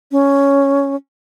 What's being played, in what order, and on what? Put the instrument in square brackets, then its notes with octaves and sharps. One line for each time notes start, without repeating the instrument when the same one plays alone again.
[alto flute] C#4